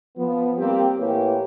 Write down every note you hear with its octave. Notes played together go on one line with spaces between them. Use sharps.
F3 B3
G3 A#3 C4 G4
A2 E3 A#3 G4 B4 C#5